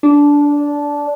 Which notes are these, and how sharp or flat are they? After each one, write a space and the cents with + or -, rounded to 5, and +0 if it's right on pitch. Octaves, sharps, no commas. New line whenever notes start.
D4 -15